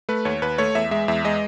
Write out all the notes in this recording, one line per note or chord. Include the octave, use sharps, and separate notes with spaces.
A3 B4
D#2 C#5
D#2 B4
A3 C#5
E2 E5
G#3 E5
E2 E5
G#3 D#5